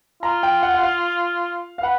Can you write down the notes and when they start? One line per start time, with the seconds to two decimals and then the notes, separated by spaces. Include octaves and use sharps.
0.23 F4 A#5
0.43 G5
0.63 F#5
0.74 F#5
0.83 F5
1.78 F5
1.83 B4 F#5